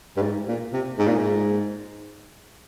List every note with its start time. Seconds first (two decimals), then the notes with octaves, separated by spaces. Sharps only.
0.17 G2
0.22 G#2
0.48 A#2
0.73 C3
0.99 G#2
1.08 A#2
1.18 G#2